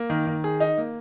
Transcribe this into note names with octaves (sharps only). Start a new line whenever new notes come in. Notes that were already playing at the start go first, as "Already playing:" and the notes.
Already playing: A#3
D#3
D#3
G#4
D#4
A#3